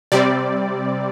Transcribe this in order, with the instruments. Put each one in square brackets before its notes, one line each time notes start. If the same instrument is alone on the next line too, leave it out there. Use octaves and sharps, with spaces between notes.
[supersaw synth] C3 G3 C4 D5